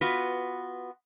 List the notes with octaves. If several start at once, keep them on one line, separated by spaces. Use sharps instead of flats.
B3 F4 F#4 B4